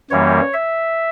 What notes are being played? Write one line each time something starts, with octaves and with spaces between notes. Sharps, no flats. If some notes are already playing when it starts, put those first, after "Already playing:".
F#2 E3 G3 A#3 C#5
E5